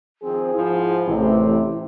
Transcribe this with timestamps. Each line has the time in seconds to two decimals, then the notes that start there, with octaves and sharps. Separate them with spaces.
0.23 D#3 F3 C4 G#4
0.54 G#2 F3 E4
1.08 A1 C3